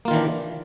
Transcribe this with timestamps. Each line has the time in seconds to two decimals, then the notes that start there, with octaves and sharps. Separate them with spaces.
0.05 A#3
0.08 F4
0.11 D#3
0.13 E3
0.16 D4